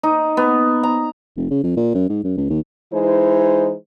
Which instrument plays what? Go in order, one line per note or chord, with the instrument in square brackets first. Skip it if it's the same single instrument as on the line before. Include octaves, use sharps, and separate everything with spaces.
[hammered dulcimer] D#4
B3
A#5
[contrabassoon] F1
C#3
F2
A#2
F#2
G#2
F#2
C#2
D#2
[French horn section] E3 G#3 D#4 E4 C5